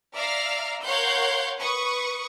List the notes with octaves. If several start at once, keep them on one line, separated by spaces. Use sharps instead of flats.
D5 E5 F5 A#5 F6 A#6
A#4 C#5 F5 F#5 C6 G6
B4 C#6 D#6